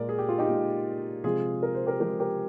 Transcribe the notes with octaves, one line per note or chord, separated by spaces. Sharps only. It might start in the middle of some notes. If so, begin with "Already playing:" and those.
Already playing: A#2 G#3 A#4 D5
G#4
G4
F4
D#4 G4
A#2 G#3
C3 F3 G#3 F4 G#4
A#4
C5
G4 A#4
C3 F3 G#3 G4 A#4
G4 A#4